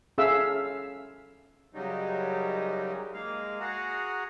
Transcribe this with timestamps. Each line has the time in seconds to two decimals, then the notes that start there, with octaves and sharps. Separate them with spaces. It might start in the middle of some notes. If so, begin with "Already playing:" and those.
0.18 C#4 G#4 A4 E5 F5 E6
1.74 F#2 C#3 F#3 G3 D#4
3.14 G#3 A#3 F5
3.60 F#4 G#4 F#5 A#5